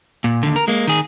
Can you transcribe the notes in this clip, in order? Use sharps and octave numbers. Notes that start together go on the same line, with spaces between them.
A#2
D#2 D3
A#4
G#3 A#3
D#3 G#4